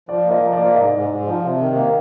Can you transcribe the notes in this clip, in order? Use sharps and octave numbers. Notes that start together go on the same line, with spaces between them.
F3 D5
A#3
D#5
F3
D5
A#3
G#2 D#5
G#2
G#2
F3
C3
D#3
A#3